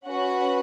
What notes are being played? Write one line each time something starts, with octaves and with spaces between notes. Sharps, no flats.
C#4 F#4 B4 F#5